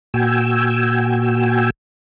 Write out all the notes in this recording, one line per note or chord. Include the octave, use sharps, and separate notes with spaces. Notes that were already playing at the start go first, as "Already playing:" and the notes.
A#2 F#4 G5 G#5 E6